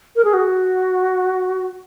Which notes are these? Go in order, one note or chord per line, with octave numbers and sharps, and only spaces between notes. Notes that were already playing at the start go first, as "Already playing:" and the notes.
A#4
G#4
F#4